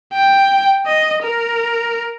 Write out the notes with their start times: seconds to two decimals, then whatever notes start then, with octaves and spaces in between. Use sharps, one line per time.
0.13 G5
0.86 D#5
1.23 A#4